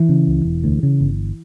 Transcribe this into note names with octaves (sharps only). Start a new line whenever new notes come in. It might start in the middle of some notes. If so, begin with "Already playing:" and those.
Already playing: E3
C#3
C#2
E1
D2
C#3
G1